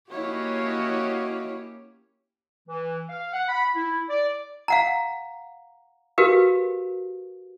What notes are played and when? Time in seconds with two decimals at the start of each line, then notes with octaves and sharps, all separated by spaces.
0.11 A#3 C#4 E4 F#4 G4 C#5 D#5 F5
2.68 E3
3.10 F5
3.33 F#5
3.49 B5
3.75 E4
4.10 D5
4.68 F5 F#5 A#5
6.18 F#4 G4 A#4 B4 F5